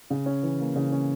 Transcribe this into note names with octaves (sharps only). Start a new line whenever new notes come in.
C#3
C#4
E3
A#3
C#3
C#4